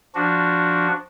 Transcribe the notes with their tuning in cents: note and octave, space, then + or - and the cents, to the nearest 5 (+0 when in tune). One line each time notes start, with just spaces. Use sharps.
F3 +0 D4 -5 F#4 +0